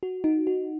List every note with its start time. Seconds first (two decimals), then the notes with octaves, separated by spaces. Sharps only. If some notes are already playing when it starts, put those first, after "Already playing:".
0.03 F#4
0.24 D#4
0.47 F#4